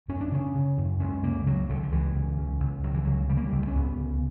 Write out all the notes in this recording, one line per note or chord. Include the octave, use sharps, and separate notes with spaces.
F#2 C#4
D4
C#3 C#4
C#3
F#2
C#2 C#4
C#3 A#3
C#3 F#3
C#2 D3
D3
C#2 E3
C#3
C#3
C#2
C#2 F#3
E3
C#3 F#3
C#3 G3
A#3
G3
C#2
C#4
C#2 B3
C#3